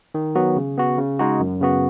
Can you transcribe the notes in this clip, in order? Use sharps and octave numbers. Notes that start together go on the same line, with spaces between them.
D#3
F#3 B3 F#4
C#3
B3 F#4
C#3
G#3 D#4 F#4
F#2
C#3 B3 F#4